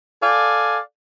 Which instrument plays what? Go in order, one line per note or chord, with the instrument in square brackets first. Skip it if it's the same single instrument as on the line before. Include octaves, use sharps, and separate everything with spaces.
[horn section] A4 D5 F5 G#5